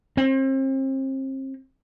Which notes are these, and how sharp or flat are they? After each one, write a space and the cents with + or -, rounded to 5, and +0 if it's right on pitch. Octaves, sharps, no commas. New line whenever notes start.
C4 +35